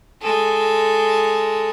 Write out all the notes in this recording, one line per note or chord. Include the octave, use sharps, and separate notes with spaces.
G#3 A4